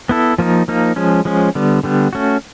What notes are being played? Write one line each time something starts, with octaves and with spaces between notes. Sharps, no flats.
B3 E4 A4
F3 A#3 D#4
F3 A#3 D#4
F3 G#3 C#4
F3 G#3 C#4
D3 G3 B3
D3 G3 B3
A3 C#4 F#4